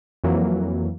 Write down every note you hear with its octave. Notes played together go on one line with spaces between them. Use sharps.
F2 E3 F#3 A#3